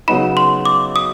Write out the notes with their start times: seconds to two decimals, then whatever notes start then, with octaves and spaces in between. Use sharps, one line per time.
0.08 C#3 F#3 B3 D#4 B5
0.37 C6
0.65 D6
0.96 D#6